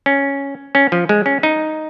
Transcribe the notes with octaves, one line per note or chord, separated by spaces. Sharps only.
C#4
C#4
F3
G#3
C#4
D#4